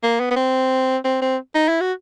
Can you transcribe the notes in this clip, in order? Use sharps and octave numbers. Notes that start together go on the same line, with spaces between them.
A#3
B3
B3
C4
C4
C4
D#4
E4
F#4